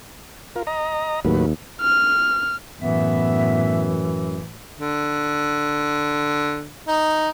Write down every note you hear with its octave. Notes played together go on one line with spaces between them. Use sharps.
F4 A#4
D#5 A#5
D#2 A2 F#3 B4
F6
F#2 A2 E3 B3 E5
D3
D#4